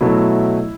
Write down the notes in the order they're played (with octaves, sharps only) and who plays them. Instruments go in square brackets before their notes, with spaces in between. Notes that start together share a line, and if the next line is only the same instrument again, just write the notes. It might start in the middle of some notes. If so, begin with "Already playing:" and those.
[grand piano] B2 F#3 A3 E4